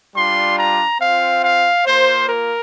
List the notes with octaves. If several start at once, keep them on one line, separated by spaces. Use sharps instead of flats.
G3 D4 F4 C6
A#5
C4 F5
F4
F5
A#3 F4 C5
A#4